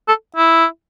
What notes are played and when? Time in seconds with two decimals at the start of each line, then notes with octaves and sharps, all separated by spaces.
0.08 A4
0.36 E4